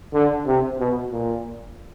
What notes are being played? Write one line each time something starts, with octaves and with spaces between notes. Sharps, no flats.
D3
C3
B2
A#2